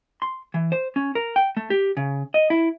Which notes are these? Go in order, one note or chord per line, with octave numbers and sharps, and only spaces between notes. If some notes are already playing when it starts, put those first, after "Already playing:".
C6
E3
C5
C#4
A#4
G5
A3
G4
C#3
D#5
E4